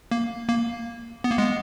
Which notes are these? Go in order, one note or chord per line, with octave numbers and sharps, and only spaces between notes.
A#3
A#3
B3
A#3
G#3 B3